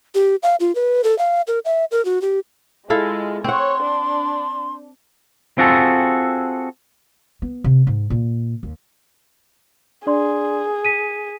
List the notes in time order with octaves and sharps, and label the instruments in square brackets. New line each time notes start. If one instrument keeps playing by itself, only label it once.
[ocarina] G4
F5
F4
B4
A4
F5
A#4
E5
A#4
F#4
G4
[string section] G#3 [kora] E4 A4 F5 [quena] F4
[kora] C4 F#5 [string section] C#5 [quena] C6
[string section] D4
[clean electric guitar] C4 F4 F#4 G#4 A4
[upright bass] B3
C3
G#2
A#2
D#2
[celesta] D4 D5 C6 [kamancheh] G#4
[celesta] B6 D#7